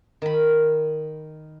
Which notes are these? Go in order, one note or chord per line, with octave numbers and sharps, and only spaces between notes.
D#3 B5